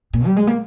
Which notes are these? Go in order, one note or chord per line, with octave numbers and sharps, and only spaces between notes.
A#2
G3
G#3
A#3